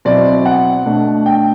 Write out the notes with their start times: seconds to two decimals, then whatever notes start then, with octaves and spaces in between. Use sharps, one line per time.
0.05 B2 F#3 C4 E4 D5
0.46 F#5
0.86 B2 A3 D4
1.26 G5